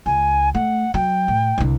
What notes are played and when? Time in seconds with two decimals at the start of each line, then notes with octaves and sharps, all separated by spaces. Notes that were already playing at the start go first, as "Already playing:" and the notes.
0.06 C#2 G#5
0.54 A3 F#5
0.94 F#3 G5
1.28 A2
1.58 C2 D3